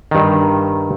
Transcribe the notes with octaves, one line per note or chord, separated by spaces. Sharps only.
G2 D#3